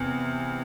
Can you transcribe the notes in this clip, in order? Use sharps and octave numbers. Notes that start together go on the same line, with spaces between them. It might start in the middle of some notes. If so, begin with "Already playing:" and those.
Already playing: E2 C3